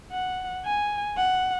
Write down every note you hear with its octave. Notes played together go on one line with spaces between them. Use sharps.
F#5
G#5
F#5